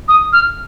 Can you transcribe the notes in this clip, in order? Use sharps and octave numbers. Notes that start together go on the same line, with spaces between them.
D#6
F6